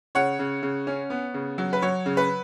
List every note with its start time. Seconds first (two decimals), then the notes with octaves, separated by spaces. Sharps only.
0.15 C#3 C#5 F#5
0.39 C#3
0.63 C#3
0.87 C#4
1.10 B3
1.34 C#3
1.58 F#3
1.73 B4
1.82 F#3 C#5
2.06 C#3
2.17 B4